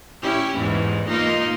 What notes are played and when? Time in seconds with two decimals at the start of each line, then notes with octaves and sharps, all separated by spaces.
0.22 C#4 E4 G4
0.58 E2 G#2 E3
1.09 A#3 D#4 F4